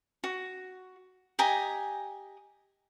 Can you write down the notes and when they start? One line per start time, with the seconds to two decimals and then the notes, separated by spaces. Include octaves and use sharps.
0.24 F#4
1.39 G4 D#5 G#5 A#5